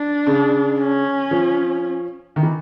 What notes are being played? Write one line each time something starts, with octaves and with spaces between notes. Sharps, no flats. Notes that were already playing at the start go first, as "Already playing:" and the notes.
Already playing: D4
C#3
C#4
F3
D#3
E3